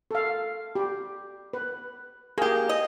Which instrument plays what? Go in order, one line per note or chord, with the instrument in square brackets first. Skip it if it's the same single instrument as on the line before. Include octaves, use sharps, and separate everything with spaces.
[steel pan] A4 F5
G4
B4
[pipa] A#3 G4 [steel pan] G#4
[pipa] D#5